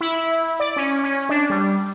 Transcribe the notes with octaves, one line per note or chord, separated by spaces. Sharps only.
E4
D5
C#4
C#4
D4
G3